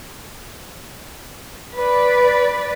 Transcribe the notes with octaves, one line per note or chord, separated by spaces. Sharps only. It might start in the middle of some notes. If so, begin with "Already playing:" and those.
B4 D5